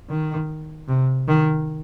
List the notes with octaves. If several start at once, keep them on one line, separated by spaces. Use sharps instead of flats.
D#3
C3
D#3